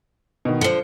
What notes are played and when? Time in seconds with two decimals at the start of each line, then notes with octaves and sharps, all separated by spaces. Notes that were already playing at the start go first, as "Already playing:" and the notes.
0.45 B2 D#3
0.61 D3 F3 C#7 G7